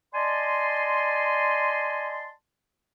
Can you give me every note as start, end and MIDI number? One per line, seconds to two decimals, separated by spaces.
0.15 2.31 74
0.15 2.31 75
0.15 2.31 80
0.15 2.31 81
0.15 2.31 84